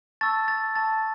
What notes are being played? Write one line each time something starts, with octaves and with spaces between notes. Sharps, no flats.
A5 C#6 E6 A6
A6
A5 C#6 E6 A6